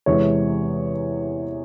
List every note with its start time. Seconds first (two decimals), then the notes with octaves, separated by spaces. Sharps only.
0.06 E2 C3 E3 G#3 C#5